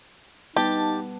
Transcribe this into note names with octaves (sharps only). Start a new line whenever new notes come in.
G3 B3 D#4 G4 B4 A5